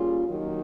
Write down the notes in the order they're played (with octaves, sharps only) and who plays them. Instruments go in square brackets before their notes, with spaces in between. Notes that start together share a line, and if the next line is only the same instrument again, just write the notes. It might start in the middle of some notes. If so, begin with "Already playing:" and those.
Already playing: [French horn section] G3 A#3 C#4 F4 G#4
D#2 D#3 F#3